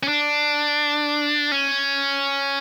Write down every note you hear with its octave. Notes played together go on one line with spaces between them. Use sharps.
C#4
D4
C#4